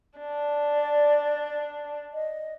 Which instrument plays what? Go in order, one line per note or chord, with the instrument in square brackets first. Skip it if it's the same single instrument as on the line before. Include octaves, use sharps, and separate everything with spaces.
[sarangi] D4
[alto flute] D5
D#5